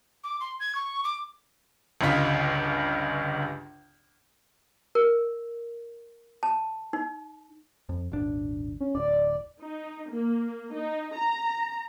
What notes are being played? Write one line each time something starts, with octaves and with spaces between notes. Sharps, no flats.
D6
C6
G#6
C#6
D6
G1 C#2 G2 D#4 F4 B6
A#4
A5
D#4
F2
D#1 G#1 D4
C#4
D1 D5
D#4
A#3
D#4
A#5